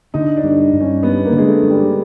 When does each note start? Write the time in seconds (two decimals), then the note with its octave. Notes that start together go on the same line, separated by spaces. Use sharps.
0.14 D3 D#4
0.36 D4
0.43 G2
0.73 G2
0.81 C#4
1.03 G3 B3
1.25 A#3
1.32 D3
1.38 G#3
1.47 A3
1.63 G2
1.70 G3